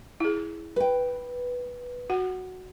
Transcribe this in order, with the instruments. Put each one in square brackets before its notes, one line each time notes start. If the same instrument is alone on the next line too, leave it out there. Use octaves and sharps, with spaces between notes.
[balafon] E4 G#4
[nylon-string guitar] B4 G5
[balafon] F#4 F#5